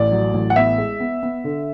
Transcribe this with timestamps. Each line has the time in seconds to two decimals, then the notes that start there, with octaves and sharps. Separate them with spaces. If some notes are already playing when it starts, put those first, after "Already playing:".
Already playing: A1 D5
0.12 F#3
0.34 A1
0.50 F#5
0.56 B3 E5
0.78 G#3
1.00 B3
1.23 B3
1.44 D3